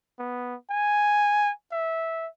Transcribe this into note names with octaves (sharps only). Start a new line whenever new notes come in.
B3
G#5
E5